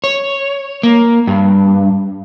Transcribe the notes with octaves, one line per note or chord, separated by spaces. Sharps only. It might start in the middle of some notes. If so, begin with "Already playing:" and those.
C#5
A#3
G2